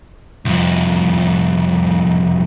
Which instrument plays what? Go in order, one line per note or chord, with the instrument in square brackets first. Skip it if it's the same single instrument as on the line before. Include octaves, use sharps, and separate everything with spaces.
[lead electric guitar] C2 F2